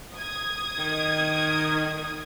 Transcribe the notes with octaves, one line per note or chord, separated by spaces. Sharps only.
D#6 G#6
D#3